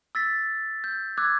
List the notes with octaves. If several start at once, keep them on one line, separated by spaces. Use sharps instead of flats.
E6 A6 B6
G6
D6 E6 F#6 G#6